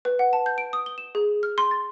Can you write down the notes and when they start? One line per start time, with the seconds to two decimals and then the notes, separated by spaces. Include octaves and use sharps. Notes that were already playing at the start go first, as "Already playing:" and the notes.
0.05 B4
0.19 F#5
0.33 A5
0.46 G6
0.58 D7
0.73 D#6
0.86 G7
0.98 E7
1.15 G#4
1.43 F6
1.58 C6
1.71 A6